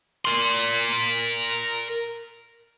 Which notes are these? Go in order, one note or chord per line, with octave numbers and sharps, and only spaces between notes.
A#4 C6